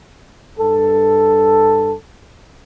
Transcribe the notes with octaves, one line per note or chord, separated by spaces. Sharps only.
G2 A4